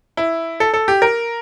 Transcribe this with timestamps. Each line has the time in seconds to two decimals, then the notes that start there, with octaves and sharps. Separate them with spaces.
0.17 E4
0.60 A4
0.74 A4
0.88 G4
1.02 A#4